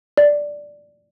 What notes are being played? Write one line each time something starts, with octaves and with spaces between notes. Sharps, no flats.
D5